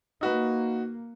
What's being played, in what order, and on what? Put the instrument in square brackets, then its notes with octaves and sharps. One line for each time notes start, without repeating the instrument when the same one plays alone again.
[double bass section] A#3 [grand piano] D#4 F#4 B4